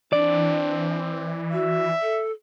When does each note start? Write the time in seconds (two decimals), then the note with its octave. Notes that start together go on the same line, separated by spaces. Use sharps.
0.13 E3 C4 D4 D5
1.52 F#4 E5
2.02 A4